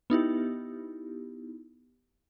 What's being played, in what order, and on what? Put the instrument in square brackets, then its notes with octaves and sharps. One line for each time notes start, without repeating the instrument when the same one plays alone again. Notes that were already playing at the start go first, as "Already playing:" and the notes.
[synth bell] B3 D#4 E4 G4